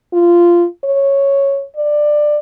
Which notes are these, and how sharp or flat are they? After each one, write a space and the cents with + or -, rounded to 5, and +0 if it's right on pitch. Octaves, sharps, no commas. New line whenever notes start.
F4 -15
C#5 -5
D5 +15